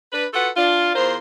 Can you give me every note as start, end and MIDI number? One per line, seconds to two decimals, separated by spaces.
0.13 0.25 62
0.13 0.25 71
0.34 0.49 65
0.34 0.49 66
0.34 0.49 69
0.34 0.49 71
0.34 0.49 78
0.57 0.93 62
0.57 0.93 65
0.95 1.17 40
0.95 1.17 65
0.95 1.17 70
0.95 1.17 72